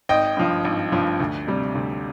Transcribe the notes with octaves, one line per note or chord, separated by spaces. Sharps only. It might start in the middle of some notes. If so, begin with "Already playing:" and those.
G#1 D#5 G5
G2 F3
G#1
G2 F3
D2
C3 G3
D2